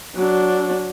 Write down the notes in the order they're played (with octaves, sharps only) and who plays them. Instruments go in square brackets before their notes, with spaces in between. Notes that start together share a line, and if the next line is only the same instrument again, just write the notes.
[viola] F#3 D4